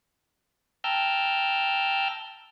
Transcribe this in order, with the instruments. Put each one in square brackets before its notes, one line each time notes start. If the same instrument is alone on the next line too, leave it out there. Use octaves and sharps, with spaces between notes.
[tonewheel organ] G5 A5 A#5 E6 F6 G6